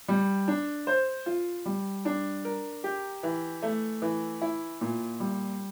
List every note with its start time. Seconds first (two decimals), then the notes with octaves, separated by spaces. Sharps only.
0.08 G3
0.48 D4
0.87 C5
1.26 F4
1.66 G3
2.05 D4
2.45 A#4
2.84 G4
3.23 E3
3.62 A3
4.02 E3
4.41 E4
4.81 A#2
5.20 G3